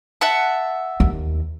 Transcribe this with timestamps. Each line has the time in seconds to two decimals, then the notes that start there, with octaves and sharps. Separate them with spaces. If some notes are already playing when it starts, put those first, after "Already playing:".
0.21 E5 F#5 A5
1.00 D#2